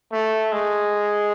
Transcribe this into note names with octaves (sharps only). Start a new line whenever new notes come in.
A3
G#3